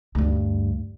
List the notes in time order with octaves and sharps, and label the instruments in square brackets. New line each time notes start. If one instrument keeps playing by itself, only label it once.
[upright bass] D2 G2